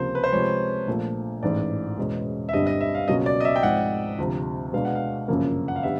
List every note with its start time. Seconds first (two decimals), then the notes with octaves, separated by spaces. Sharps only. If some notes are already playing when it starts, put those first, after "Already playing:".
Already playing: C#2 C3 F3 A#3 C5
0.15 B4
0.24 C5
0.32 C3 F3 G#3 C#5
0.88 A#1 A#2 F3 A3
1.43 A1 G#2 E3 A3 D5
1.97 E2 B2 G#3 C#4
2.49 E5
2.53 G1 G2 D3 G3 C4 D#5
2.67 D#5
2.81 E5
2.95 F5
3.08 C#2 B2 F#3 A#3 C#4 D#5
3.26 D5
3.40 D#5
3.45 E5
3.56 G5
3.63 G#2 F3 G#3 C4 F#5
4.18 D2 C3 F3
4.73 B2 G#3 B3 D4 F5
4.85 F#5
4.95 F5
5.28 G1 F#2 C#3 F3 A#3
5.68 F#5
5.76 F5
5.83 D3 G3 B3 E5